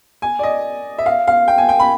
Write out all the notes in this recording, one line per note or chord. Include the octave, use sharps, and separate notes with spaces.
G#5
D5
D#5
E5
F5
F5
G5
G#5
G5
B5